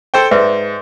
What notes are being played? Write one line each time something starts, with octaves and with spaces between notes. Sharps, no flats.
A4 C5 G5
G#2 B4 D5 E5